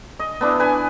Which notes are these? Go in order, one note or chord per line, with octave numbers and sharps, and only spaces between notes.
D#5
B3 D4 E4
B4 G#5